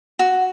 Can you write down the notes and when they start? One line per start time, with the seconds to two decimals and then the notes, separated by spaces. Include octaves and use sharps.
0.19 F#4